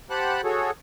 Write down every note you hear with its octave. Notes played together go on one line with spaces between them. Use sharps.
G4 C5 F#5 A5 B5 F#6
F#4 G#4 A4 C#5